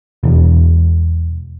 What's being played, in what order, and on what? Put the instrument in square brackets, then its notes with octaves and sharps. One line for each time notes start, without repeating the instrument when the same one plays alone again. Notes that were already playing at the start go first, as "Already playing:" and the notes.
[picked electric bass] E1